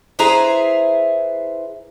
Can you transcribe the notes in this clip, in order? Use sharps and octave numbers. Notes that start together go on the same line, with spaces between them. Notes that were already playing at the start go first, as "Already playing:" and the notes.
E4 G#4 B4 C5 E5 A#5